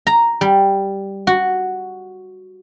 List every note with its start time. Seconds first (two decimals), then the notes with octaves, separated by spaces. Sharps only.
0.07 A#5
0.41 G3
1.27 F#4